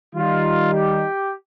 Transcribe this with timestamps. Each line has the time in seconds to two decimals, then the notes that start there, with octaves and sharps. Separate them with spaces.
0.14 D#3 G3 D#4 F4
0.72 G4